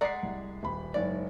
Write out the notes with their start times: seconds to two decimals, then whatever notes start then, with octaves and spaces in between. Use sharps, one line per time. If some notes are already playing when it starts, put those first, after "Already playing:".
0.01 G#3 D5 F#5 A#5 B6 C7
0.23 C2
0.63 D#1 B5
0.94 F#1 G#2 C#5 D5